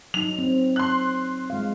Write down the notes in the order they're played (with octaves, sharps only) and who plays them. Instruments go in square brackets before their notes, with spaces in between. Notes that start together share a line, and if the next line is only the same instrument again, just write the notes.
[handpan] F#3 D#4 [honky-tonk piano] F7
[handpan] C4
[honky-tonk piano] C6 F#6
[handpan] G#3 F5